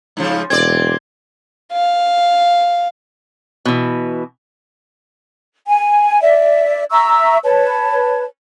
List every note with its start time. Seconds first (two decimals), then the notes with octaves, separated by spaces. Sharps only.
0.17 G#2 C#3 F3
0.50 E1 C4 D5 G#6
1.72 F5
3.65 B2 E3
5.68 G#5
6.21 D5 E5
6.90 E5 A#5 C#6 E6
7.43 B4 C#5 A5